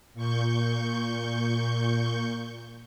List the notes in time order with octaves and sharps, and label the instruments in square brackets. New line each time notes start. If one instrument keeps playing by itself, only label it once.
[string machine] A#2 C#6 G6